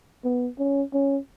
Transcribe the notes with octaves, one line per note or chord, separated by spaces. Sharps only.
B3
C#4
C#4